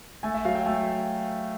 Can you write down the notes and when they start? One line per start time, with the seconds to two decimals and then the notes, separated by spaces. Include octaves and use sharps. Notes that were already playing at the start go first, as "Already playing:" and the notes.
0.23 A3 G#5
0.34 E5
0.45 F#3 F5
0.55 G5
0.66 A3 G#5